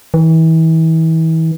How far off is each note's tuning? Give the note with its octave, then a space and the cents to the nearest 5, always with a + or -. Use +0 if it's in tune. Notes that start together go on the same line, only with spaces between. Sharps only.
E3 -35